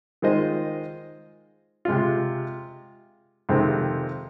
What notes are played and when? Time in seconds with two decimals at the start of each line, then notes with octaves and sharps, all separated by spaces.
0.22 D#3 G#3 F4 C5 D#5
1.85 C3 G#3 F4
3.49 F2 C3 D#3 G#3 C4